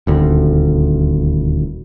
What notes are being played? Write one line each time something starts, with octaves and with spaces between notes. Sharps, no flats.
D#1 D2